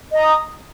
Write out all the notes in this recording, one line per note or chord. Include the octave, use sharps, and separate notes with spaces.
D#5 A#5 D#6